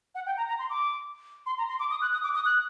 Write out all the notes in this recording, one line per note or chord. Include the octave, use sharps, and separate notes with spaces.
F#5
G5
A#5
A#5
C6
D6
C6
A#5
C6
D6
D#6
F#6
D#6
D6
D#6
F#6